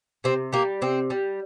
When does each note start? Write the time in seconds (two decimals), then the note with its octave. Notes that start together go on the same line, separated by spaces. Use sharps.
0.24 C3 C4
0.53 G3 A#3
0.82 C3 C4
1.10 G3